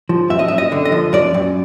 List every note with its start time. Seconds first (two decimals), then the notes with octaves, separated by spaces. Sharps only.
0.09 F3
0.30 F#2 E5
0.39 D#5
0.48 E5
0.51 F#2
0.58 D#5
0.72 D3
0.85 D#5
0.92 F3
1.13 F#2 D5
1.34 F#2